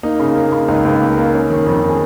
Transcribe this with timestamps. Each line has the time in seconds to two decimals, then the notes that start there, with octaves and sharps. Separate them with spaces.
0.03 A#3 D#4
0.19 C#3
0.36 A#3
0.52 C#3
0.68 C#2 D#4
0.85 C#2
1.01 A#3
1.17 A#3
1.34 C#4
1.50 D#3
1.66 F2
1.83 D#3
1.89 G#4